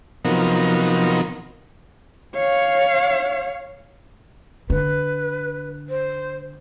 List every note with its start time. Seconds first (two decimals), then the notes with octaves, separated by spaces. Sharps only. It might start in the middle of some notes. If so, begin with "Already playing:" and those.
0.25 C3 F3 F#3 B3 D#4 A#4
2.35 C#5 F5
4.70 D3 B4
5.89 C5